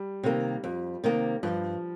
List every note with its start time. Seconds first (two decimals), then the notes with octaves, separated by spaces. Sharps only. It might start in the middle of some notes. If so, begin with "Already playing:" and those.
Already playing: G3
0.23 C3 D#3 A#3
0.64 F2
1.04 C3 D#3 A#3
1.43 G2 F3